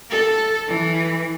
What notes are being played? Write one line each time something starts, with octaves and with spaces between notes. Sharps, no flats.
A4
E3